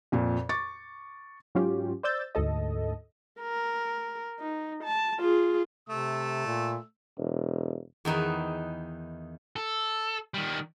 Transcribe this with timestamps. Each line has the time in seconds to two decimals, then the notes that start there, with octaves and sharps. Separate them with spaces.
0.12 F2 A#2
0.49 C#6 D6 A6
1.55 G#2 F#3 C#4 F4 G4
2.03 C5 D5 E6 G6 A6
2.35 D2 G#2 A4 D#5
3.41 A#4
4.40 D#4
4.84 A5
5.19 F4 G#4
5.89 C3 A3 E6
6.46 A#2
7.18 E1
8.05 E2 D#3 D#4 B4
9.56 A4
10.34 D#3 G3